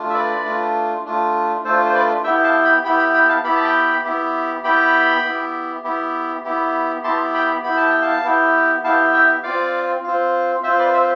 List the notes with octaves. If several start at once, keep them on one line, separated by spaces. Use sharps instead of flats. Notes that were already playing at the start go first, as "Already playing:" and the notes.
Already playing: A3 D4 F4
E5
B4 D5
A3 D4 F4
A3 D4 F4
A3 D4 F4 A4 C5
C5
B4 D5
B3 E4 G4 E5 G5
F5 A5
G5 B5
B3 E4 G4 G5 B5
G5 B5
G5 B5
F5 A5
B3 E4 G4 B5
A5
G5 B5
B3 E4 G4
B3 E4 G4 G5 B5
B3 E4 G4
B3 E4 G4
B3 E4 G4
B3 E4 G4 A5 C6
G5 B5
B3 E4 G4 B5
A5
G5
F5 A5
B3 E4 G4
B3 E4 G4 F5 A5
E5 G5
C4 F4 D5 F5
C4 F4
C4 F4 C5 E5
B4 D5
C5 E5